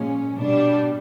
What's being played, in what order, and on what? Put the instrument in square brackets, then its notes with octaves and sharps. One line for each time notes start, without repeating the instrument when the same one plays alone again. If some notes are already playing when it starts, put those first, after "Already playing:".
Already playing: [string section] A#2 F3 G#3 C#4
B2 G3 D4